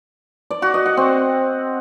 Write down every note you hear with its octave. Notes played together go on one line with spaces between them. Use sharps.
D5
F#4
D#5
F#5
C4